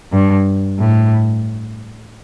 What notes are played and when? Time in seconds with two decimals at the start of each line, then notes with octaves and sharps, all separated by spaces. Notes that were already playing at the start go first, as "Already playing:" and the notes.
0.13 G2
0.79 A2